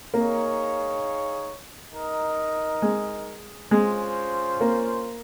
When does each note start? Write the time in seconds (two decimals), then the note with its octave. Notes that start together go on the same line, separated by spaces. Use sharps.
0.13 A#3 D#4 G#4 C#5 F5
1.93 D#4 A#4 D#5
2.82 G#3
3.71 G#3 C#4 F4 C5
4.61 A#3